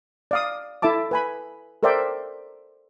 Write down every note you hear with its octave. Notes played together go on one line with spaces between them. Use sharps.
D5 F5 D#6
E4 A4 E5 A5 D6
B4 G#5 B5
A4 A#4 C5 D5 E5 G5